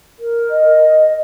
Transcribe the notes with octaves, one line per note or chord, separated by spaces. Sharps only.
A#4
D#5